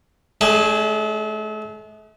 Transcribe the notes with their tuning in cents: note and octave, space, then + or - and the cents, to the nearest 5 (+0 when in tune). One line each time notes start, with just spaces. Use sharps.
A3 -40 D4 +0 G#4 -10